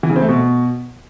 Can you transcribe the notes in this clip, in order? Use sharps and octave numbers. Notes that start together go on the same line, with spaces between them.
E3
C#3
C4
A3
B2